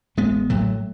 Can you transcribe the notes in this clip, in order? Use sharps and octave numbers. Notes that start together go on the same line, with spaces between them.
A1 G#3 B3
A2 F#3 A3